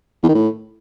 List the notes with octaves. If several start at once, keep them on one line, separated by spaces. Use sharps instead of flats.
E2
D#3
A2